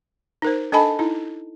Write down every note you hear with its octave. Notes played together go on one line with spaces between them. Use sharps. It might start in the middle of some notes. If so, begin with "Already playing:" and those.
D#4 A#4 C5
D4 A4 D#5 G#5 A5 B5
D#4 E4